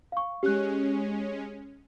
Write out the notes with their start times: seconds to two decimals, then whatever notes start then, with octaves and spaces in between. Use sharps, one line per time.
0.12 F5 C#6
0.43 G#3 C#4 G4 F#6